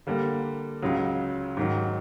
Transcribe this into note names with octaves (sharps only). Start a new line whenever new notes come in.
D3 G3 A#3
C#2 C#3 F#3
G#2 D#3 F#3